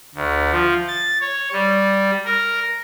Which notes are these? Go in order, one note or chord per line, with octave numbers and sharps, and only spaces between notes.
D2
F3
A6
C#5
G3
A#4